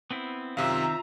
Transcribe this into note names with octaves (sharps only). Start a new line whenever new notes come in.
B3 C4 E4
F#2 C3 D#3 C4 F4 E5 F5 A#5